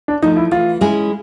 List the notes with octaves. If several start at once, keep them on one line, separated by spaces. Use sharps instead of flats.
D4
F3 A3 D#4
E4
E3 F4
G#3 C#4 E4 G#4